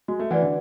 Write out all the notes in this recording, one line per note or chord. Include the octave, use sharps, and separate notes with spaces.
G#3 F#4
A3
E3 B4 D5 F#5
D3